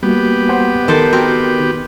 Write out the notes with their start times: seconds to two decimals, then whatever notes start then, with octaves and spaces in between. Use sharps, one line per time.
0.03 G3 A#3 B3 F#4 G4
0.49 C5 F#5
0.88 D#3 A4 C5 D5
1.13 C4 F#4 A#4